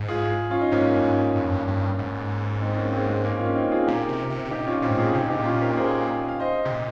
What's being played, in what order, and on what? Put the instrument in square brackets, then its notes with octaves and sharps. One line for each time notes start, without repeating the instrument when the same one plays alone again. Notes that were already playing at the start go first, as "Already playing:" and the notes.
Already playing: [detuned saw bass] G#2
[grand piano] F4 G#4
C#4 F4
D#4
[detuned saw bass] G#2 [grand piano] A#3 C#4
[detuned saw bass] G2
G#2
G2
F2
G2
G2
G#2
[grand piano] C4 D#4
A#3 C#4
G#3 C4
G#3 C4
A#3 C#4
C#4 F4
C4 D#4
F4 G#4
[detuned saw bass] A#2 [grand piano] G4 A#4
[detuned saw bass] C3
C3
C3
[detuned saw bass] A#2 [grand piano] D#4 G4
[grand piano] C#4 F4
F4
[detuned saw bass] A#2 [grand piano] C4 D#4
[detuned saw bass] G#2
[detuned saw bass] A#2 [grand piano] F4 G#4
[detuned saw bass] C3 [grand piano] D#4 G4
[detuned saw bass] A#2
[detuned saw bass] G#2 [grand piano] D#4 G4
[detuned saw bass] A#2
[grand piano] C#4 F4
G4 A#4
G#4 C5
F5
C5 D#5
[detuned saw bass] C3
A#2